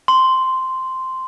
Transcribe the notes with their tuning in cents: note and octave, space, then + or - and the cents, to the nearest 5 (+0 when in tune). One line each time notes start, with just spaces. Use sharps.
C6 -5